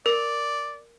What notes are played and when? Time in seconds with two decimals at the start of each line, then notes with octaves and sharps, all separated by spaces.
0.06 A#4 D5